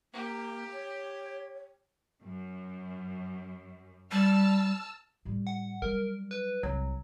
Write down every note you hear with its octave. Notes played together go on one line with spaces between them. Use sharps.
A#3 G4
C#5
F#2
G3 A5 E6 F6
A2 G3
F#5
F#3 G3 A#4
B4
C2 F#3